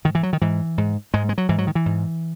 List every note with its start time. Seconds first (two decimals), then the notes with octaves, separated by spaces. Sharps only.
0.05 G#2 D#3
0.15 E3
0.23 F#3
0.33 D#3
0.41 G#2 E3
0.78 G#2
1.14 G#2 G#3
1.29 G#3
1.38 F#3
1.49 G#2 E3
1.58 F#3
1.67 D#3
1.75 E3
1.86 G#2